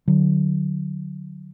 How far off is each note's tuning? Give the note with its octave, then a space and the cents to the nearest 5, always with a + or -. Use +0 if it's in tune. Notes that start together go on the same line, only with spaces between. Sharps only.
D3 +25 F#3 +0